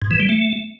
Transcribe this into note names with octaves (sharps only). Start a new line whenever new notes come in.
G#2
E3
G3
A3